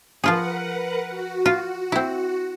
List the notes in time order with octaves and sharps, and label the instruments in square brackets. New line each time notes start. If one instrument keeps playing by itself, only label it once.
[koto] F3 F4 G#4 [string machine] A#4 B4 F#5
[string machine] F#4
[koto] F4
C4 E4